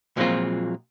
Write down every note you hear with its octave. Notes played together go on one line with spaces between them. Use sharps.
A#2 F3 F#3 G#3 C4 F4